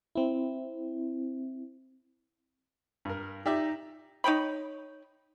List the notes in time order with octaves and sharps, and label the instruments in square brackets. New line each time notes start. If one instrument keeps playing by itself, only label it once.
[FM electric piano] C4 E4
[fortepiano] G2 A#4
[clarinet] D#4 [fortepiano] G4 D5 E5
[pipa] D#4 C#5 G5 B5